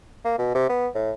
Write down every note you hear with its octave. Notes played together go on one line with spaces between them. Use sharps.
A#3
B2
C3
B3
A2